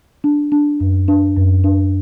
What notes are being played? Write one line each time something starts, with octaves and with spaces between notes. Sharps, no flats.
D4
D4
F#2
D4
F#2
D4